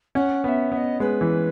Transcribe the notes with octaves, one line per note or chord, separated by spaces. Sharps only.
C#4 F#5
B3 F#5
E5
B3 E5
D#5
G#3 B4
E3